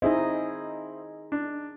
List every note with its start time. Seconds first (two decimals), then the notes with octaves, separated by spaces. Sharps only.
0.02 C4 D#4 E4 G#4 D#5
1.32 D4